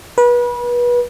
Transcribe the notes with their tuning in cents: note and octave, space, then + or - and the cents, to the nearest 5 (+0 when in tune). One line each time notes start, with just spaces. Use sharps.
B4 -30